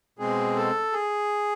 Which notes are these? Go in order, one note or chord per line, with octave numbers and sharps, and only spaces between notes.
B2 G#3 C4 G#4
A4
G#4